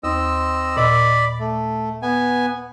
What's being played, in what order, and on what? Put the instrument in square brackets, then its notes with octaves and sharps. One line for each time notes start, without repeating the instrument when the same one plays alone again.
[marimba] D#2 [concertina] C4 D#5 E6
[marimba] A#2 D#5 E6 [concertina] D5 B5
[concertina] A3
B3 G#5